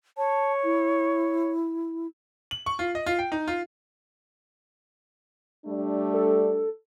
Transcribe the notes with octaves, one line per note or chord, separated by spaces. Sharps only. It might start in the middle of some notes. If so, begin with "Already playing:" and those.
C#5 A5
E4
F#7
C#6
F4
D#5
F4
G5
D#4
F4
G3 A3 D4
A4